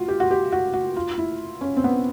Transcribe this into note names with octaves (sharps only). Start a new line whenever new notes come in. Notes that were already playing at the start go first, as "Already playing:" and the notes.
Already playing: F4 F#4
G4
F#4
G4
F#4
F#4
F4
E4
C#4
C4
B3